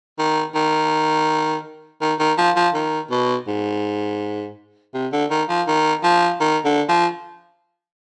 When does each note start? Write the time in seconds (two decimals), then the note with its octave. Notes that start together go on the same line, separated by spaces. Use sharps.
0.18 D#3
0.55 D#3
2.01 D#3
2.19 D#3
2.38 F3
2.56 F3
2.74 D#3
3.10 B2
3.47 G#2
4.94 C3
5.12 D3
5.30 D#3
5.49 F3
5.67 D#3
6.03 F3
6.40 D#3
6.65 D3
6.89 F3